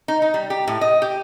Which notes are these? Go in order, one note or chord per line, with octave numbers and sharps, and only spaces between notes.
D#4
D#4
G3
G4
A2
D#5
G4